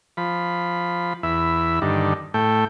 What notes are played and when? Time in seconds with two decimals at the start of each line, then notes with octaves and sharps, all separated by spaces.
0.17 F3 B5
1.23 E2 E5 B5
1.82 G2 D3 D#3
2.34 A2 A3 G5